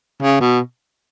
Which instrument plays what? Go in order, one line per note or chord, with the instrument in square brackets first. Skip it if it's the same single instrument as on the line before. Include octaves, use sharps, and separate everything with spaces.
[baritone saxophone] C#3
B2